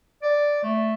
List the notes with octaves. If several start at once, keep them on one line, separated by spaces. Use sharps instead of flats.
D5
A3